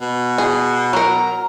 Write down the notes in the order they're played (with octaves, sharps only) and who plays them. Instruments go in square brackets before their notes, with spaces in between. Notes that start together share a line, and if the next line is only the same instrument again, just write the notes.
[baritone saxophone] B2
[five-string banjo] G#4
[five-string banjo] F#3 A#4 [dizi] A#5